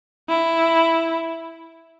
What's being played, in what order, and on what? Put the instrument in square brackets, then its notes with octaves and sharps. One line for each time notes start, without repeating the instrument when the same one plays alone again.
[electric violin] E4